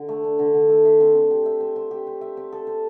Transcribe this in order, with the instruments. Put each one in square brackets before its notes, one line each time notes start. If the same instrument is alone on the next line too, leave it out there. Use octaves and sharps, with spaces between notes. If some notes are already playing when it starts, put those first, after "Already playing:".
Already playing: [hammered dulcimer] D3
A3
D4
D3
D3
A3
E5
C4
C4
G4
E5
C4
C4
G4
C5
E5
C4
A4
C5